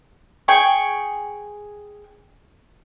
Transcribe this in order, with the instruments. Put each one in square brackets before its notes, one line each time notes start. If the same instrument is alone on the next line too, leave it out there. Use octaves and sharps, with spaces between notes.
[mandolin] G#4 G5 G#5 C#6